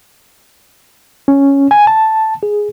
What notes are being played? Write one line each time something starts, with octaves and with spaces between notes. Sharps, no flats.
C#4
G#5
A5
G#4